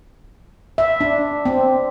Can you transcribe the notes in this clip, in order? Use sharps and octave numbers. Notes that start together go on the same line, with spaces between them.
E5
D4
C4